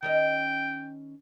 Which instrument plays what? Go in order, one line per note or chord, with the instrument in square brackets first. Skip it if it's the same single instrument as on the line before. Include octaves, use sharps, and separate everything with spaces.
[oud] D#3 C#4 D#5 [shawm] G5